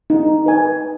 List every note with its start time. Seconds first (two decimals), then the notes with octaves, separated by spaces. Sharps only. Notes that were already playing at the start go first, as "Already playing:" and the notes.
0.10 D#4
0.46 B4 G#5